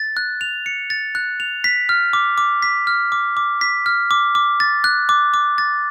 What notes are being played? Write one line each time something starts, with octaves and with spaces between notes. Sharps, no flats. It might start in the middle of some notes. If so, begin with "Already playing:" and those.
Already playing: A6
F#6
F7
C#7
A6
F#6
F7
B6
F6
D6
D6
B6
F6
D6
D6
B6
F6
D6
D6
A6
F#6
D6
D6
A6